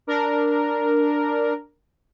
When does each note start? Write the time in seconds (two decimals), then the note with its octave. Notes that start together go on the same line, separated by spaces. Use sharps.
0.07 D4 A#4